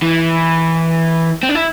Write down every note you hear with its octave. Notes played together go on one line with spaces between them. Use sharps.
E3
C4
D4
E4